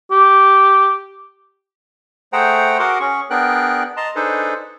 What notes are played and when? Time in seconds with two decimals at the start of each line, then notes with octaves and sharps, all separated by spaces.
0.11 G4
2.33 A3 G#4 C5 F#5 G5 A#5
2.79 F#4 G#4 A#4 F#5 C6 D6
3.00 C#4 G#4 C#6
3.30 B3 D4 G#4 A#4 G5 F#6
3.97 D#5 A5 A#5 C6
4.16 D4 D#4 G#4 A4 B4 C5